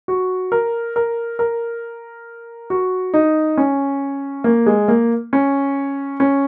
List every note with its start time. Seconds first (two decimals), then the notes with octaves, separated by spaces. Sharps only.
0.08 F#4
0.52 A#4
0.96 A#4
1.39 A#4
2.70 F#4
3.14 D#4
3.57 C#4
4.44 A#3
4.66 G#3
4.88 A#3
5.33 C#4
6.20 C#4